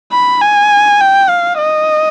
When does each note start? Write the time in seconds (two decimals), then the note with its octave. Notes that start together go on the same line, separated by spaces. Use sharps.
0.12 B5
0.42 G#5
1.01 G5
1.30 F5
1.59 D#5